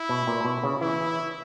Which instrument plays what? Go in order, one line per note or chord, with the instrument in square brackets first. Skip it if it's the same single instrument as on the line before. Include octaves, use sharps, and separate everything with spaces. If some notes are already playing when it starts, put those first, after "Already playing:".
Already playing: [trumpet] E4
[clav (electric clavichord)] B2
A#2
B2
C#3
[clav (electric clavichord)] E3 [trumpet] E4